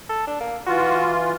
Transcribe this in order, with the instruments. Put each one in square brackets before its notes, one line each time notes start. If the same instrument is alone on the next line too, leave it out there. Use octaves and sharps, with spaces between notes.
[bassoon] A4
D4
A#3
[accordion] E3 F4 [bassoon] F#4